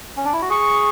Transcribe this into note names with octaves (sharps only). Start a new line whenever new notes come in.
C#4
D4
E4
F#4
G#4 C#6